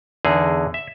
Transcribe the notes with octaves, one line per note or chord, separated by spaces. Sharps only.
E2 D3 D#4 G#4
E5